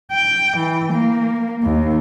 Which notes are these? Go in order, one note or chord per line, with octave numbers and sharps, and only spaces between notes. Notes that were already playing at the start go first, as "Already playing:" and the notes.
G5
E3
A#3
D#2